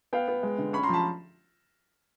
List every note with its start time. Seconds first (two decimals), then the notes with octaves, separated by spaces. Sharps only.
0.13 B3 F5 G5
0.28 B3
0.43 G#3
0.58 D3
0.73 C#4 B5 C#6
0.83 A#5 C6
0.89 F3 A5 B5